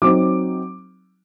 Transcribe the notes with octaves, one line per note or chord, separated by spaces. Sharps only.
F#3 C4 D#4 D6